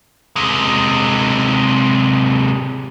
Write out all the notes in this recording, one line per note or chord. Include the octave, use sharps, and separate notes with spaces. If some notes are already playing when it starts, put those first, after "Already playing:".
C3 G#3